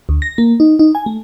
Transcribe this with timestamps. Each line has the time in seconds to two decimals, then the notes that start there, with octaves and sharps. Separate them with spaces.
0.09 D2
0.22 A#6
0.38 A#3
0.60 D#4
0.79 D#4
0.95 G#5
1.06 A3